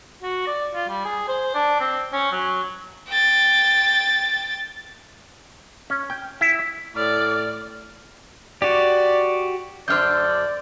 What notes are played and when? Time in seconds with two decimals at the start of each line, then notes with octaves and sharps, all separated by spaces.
0.22 F#4
0.47 D5
0.74 F4
0.88 G3
1.05 G#4
1.28 C5
1.54 D4
1.80 C4
2.13 C#4
2.32 F#3
3.09 G5 A6
5.90 C#4
6.10 G5
6.41 E4
6.96 A2 D5 F6
8.62 F#4 G4 D5
9.88 F#2 D3 C5 D5 F6 G6